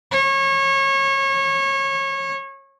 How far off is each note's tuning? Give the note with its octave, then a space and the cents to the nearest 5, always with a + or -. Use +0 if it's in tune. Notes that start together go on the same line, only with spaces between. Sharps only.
C#5 -25